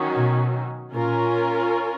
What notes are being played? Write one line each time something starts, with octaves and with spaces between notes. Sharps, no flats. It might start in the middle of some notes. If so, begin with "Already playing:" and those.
Already playing: D#3 F#3 C#4 F#4
B2
A#2 C#4 F4 A#4